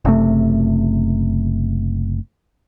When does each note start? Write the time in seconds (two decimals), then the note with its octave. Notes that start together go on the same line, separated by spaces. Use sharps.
0.05 F#1 C3 A3